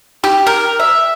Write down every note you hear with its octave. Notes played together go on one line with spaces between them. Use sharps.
G4
A#4
E5